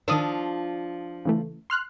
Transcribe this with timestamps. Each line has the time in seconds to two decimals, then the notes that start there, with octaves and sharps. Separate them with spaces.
0.08 D#3 F3 D4 F4 D#6 E6
1.25 C#3 E3 A3
1.70 C6 F6 F#6